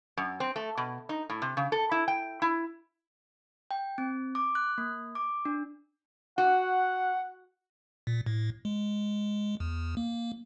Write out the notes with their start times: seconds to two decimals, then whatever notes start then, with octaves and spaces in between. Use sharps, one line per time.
0.17 F#2
0.40 C4
0.56 A3
0.77 B2
1.09 D#4
1.30 A2
1.42 C3
1.57 C#3
1.72 A4
1.91 E4
2.08 G5
2.42 E4
3.71 G5
3.98 C4
4.35 D6
4.55 F#6
4.78 A#3
5.15 D6
5.45 D4
6.38 F#4 F#5
8.07 A#2
8.26 A2
8.65 G#3
9.60 E2
9.97 A#3